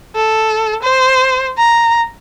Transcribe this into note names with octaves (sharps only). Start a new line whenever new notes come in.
A4
C5
A#5